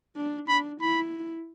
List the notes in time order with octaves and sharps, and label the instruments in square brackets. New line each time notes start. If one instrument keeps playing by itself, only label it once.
[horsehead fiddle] D4
[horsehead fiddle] D4 [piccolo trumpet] B5
[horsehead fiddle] E4 [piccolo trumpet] B5